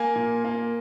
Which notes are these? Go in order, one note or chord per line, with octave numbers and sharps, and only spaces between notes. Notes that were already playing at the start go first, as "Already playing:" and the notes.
Already playing: A#3 G#5
A#2
A#3